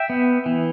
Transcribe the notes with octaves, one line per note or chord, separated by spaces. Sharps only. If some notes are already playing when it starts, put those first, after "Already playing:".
Already playing: E5 G5
B3
E3